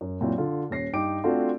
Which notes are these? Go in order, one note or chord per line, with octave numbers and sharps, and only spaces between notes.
F#2
A#2 F#3 C4 E4
D3 F4
D#1 C#4 A#6 C7
G2 D#4 G5 D6 D7
A3 C4 D4 F4 F#4